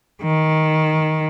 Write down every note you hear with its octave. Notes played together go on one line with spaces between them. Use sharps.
D#3